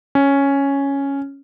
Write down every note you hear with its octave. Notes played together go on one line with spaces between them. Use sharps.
C#4